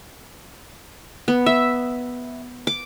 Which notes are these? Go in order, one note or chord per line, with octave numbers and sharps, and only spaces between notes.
B3
E5
D6